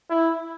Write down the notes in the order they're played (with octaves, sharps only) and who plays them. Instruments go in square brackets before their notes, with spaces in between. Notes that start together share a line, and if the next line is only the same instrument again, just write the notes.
[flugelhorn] E4